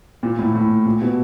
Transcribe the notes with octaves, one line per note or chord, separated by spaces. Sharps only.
A#2
A2
A2
A#2
B2